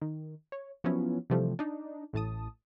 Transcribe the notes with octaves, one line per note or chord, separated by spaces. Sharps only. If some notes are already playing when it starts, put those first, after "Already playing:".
D#3
C#5
F3 F#3 B3 C#4 E4
C3 E3 F3 G3 A3
D4 D#4
A1 A2 A5 D#6